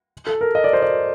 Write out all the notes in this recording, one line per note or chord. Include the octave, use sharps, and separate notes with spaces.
A4
A#4
D#5
D5
C5
D5